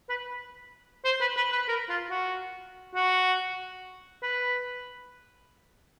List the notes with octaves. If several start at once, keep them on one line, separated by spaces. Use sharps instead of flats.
B4
C5
B4
B4
B4
A#4
F4
F#4
F#4
B4